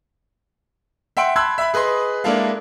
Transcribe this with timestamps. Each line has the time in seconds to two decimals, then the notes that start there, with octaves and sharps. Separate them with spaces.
1.17 E5 F#5 G5 C6 D7
1.36 A5 B5 C6 E6 F#6 G#6
1.58 E5 B5
1.74 G#4 B4 D#5 C6
2.24 G#3 A#3 D4 E4 A4 F5